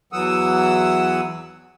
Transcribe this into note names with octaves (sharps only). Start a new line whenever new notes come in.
E2 E3 F#3 F#5 D#6 E6